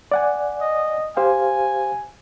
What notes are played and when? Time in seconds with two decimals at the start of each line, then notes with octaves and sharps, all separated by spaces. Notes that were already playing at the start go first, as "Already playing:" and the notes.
0.12 D5 F#5 G#5
0.61 D#5
1.17 G4 C5 F5 G#5